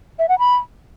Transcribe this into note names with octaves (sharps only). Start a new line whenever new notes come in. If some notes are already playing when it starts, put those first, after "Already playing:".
E5
F#5
B5